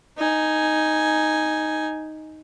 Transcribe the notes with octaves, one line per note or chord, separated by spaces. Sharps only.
D#4 G#5